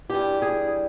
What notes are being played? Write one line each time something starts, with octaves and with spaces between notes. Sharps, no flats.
G2 E3 G3 G4
G#4